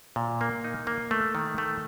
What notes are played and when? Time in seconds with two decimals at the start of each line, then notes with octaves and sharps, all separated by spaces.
0.16 A#2
0.41 A#3
0.64 D#4
0.87 A#3
1.11 A3
1.35 D#3
1.58 A3